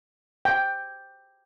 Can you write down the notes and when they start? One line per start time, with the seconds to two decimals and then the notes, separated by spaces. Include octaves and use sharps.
0.45 G5